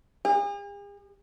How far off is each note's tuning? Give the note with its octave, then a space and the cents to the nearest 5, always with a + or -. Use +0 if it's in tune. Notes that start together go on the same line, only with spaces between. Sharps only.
G#4 -45